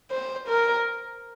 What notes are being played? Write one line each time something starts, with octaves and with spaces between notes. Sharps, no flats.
C5
A#4